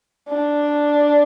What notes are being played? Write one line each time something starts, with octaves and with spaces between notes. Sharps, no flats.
D4